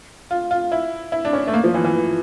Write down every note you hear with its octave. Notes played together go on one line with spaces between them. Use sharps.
F4
F4
E4
E4
D4
C#4
A3
A#3
F3
E3
E3